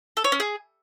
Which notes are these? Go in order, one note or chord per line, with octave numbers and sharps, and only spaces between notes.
A4
C#5
C#4
G#4